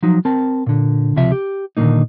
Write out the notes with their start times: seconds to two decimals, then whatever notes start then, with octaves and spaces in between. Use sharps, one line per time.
0.03 F3 F#3 D#4
0.25 C4 A#4 A5
0.66 A#2 D3
1.16 C#2 C3 F3 E5
1.32 G4
1.77 A#2 D3 D#3 F3 A#3 D#4